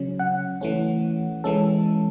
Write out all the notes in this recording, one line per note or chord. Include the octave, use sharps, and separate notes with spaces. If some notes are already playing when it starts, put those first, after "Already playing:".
Already playing: C#3 F#3 C#4
F#5
E3 A3 C#4
E3 G#3 C#4 A4